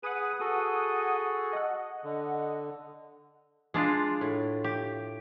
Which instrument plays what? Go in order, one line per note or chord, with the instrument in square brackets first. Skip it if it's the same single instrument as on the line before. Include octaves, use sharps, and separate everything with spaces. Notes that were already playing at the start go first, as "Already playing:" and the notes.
[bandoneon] G#4 B4 [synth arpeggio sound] F#5 D#6 D#7
[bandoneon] F#4 G#4 A4
[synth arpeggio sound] D#5 F#5
[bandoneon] D3
[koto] G#3 D4 F4
A2
G4